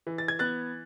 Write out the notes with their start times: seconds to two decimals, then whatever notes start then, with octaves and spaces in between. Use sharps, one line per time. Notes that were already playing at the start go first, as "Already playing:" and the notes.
0.07 E3
0.18 A6
0.28 G#6
0.39 B3 F#6 A6